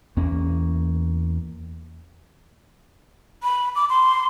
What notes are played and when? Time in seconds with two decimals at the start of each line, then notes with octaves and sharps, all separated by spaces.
0.17 E2 A#3 C#4
3.43 B5
3.76 D6
3.90 C6